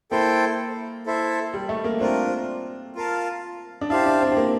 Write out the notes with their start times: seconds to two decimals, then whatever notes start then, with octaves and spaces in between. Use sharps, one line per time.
0.11 A#3 E4 A4 C5 G5
1.06 E4 A4 C5 E5
1.54 G3
1.69 A3
1.84 A#3
2.00 C4 D4 F4 A#4
2.95 F4 A#4 F5 A5
3.81 D4
3.90 E4 G4 C5 F5 A5
4.06 D4
4.21 C4
4.32 C4
4.37 A#3